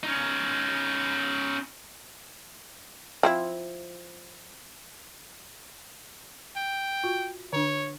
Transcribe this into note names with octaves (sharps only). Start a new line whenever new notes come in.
C#4 D#4
F3 C4 E4
G5
F4 F#4
D3 D4 C#5